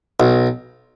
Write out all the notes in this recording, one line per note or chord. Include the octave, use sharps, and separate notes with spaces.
B1